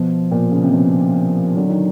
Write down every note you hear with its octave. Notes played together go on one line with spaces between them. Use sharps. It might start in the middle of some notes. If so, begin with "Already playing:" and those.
Already playing: B2 F3
A#2
C#3
C3
B2 F3
D3 F#3
D#3